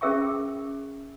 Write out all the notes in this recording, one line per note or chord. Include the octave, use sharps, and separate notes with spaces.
C#4 G#4 A#4 E5 G5 C#6